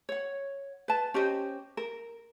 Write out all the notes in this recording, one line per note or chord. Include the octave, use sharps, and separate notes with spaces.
C#5 F#5
B4 A5
C#4 G4 C5 D#5
A#4